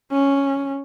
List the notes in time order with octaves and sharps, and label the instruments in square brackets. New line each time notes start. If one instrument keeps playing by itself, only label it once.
[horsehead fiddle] C#4